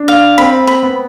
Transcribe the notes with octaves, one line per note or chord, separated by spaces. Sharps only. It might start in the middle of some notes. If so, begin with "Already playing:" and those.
Already playing: D4
F5
C4 B5
B5
B3